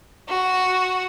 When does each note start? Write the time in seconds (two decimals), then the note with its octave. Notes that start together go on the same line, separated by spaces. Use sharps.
0.29 F#4